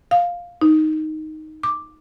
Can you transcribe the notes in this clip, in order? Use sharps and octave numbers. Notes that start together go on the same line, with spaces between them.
F5
D#4
D6